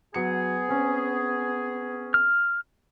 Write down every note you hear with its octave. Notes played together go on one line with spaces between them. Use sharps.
F#3 B3 G#4 C#7
C4 C#4
F6